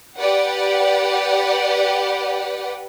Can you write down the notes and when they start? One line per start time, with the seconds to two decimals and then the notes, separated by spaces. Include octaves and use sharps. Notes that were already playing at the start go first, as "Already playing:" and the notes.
0.17 G4 B4 D5 F#5